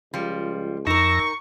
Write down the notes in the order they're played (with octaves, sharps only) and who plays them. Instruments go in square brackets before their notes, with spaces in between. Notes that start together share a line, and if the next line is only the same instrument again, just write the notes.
[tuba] C#2 [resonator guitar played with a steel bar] F3 G3
[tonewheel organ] F2 E6 A#6 [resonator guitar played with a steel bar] D#4 A#4 [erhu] C#6